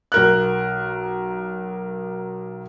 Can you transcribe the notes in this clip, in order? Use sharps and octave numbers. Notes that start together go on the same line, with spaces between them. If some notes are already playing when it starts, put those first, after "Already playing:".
B1 A#4 F#6